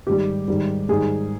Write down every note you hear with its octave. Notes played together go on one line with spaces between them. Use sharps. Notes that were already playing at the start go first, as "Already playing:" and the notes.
G#2 D#3 G3 G4
G#2 D#3 G3
G#2 D#3 G3 G#4